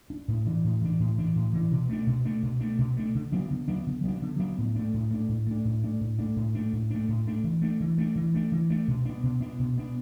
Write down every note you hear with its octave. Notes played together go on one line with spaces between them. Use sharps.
D4
A2
E3 D4
A2
E3 D4
A2
E3 D4
A2
E3 D4
B2
A3 D4
B2
A3 D4
B2
A3 D4
B2
A3 D4
D3
F#3 B3 D4
D3
F#3 B3 D4
D3
F#3 B3 D4
D3
F#3 B3 D4
A2
A3 D4
A2
A3 D4
A2
A3 D4
A2
A3 D4
A2
A3 D4
A2
A3 D4
A2
A3 D4
A2
A3 D4
E3
A3 D4
E3
A3 D4
E3
A3 D4
E3
A3 D4
B2
B3 D4
B2
B3 D4
B2
B3 D4